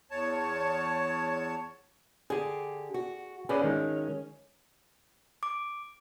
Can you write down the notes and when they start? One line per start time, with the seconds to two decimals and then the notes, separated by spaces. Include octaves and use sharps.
0.11 E2 C#5 A5
2.30 D3 G4 G#4 G#5
2.94 F#4
3.49 C#4 G#4 B4 D5
3.63 D#3 G#3
5.43 D6